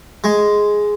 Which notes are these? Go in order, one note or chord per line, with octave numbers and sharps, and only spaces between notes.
G#3